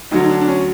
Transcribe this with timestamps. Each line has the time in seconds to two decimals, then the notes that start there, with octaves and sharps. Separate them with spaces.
0.11 D2 D3 F#3 D#4
0.24 D#4
0.30 D4
0.41 D4
0.48 C#4